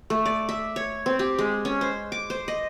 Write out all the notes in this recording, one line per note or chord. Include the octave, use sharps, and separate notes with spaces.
A3
D5
E5
C#5
C4
G4
G#3
C#4
C5
D6
C5
D#5